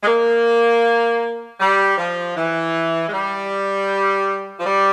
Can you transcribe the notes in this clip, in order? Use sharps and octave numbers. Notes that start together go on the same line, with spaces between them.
G#3
A#3
G3
F3
E3
G#3
G3
F3
G3